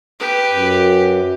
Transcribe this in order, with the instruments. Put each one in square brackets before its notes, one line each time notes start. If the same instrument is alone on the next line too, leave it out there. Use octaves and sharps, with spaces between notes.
[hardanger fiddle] G4 [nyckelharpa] B4
[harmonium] F#2